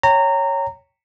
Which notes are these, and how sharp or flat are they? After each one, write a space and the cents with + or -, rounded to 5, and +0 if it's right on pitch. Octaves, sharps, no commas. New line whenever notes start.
C#5 +0 G5 +0 A#5 -20